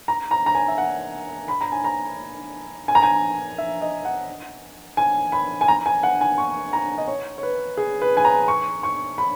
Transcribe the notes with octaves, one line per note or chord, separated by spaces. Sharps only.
A#5
A#5
A#5
G#5
E5
F#5
B5
A#5
G#5
A#5
G#5
A#5
G#5
E5
D#5
F#5
G#5
B5
G#5
A#5
G#5
F#5
G#5
C#6
A#5
D#5
C#5
C#5
B4
G#4
B4
G#5
A#5
C#6
C#6
B5